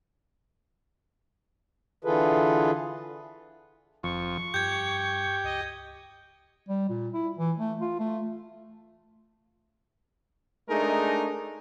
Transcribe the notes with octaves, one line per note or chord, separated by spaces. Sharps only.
D3 E3 F4 G#4 A4 B4
F1 F2 C#6
G2 G4 G6 G#6
C#2 D#5
G3
A#2
E4
E3
A3
F4
A3
G#3 A3 D4 D#4 G#4 A#4